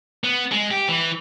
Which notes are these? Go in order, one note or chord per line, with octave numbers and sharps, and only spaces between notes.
B3
G#3
G4
E3